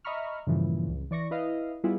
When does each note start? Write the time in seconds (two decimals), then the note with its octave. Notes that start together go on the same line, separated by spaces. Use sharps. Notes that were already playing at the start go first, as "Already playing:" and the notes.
0.04 D#5 E5 A#5 B5 C#6 F6
0.47 G2 A#2 C#3 E3 F3
0.88 C#2
1.11 E3 D5 C#6 A#6
1.31 E4 B4 D#5 F5
1.84 G3 B3 E4 F4 G#4